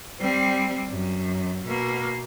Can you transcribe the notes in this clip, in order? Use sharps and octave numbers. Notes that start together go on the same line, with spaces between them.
G3 C4
F#2
B2 A#3